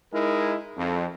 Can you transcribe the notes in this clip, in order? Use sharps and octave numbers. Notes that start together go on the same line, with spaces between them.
G#3 D#4 E4 A#4
F2